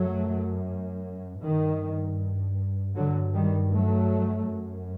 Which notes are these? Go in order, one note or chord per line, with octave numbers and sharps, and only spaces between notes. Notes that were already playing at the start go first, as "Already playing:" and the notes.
Already playing: F#2 F#3 A3
G2 D#3
G2 D3 F#3
D#3 G3
F#3 A3
F#2